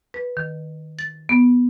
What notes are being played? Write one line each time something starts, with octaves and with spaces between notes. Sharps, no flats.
B4
D#3
A6
B3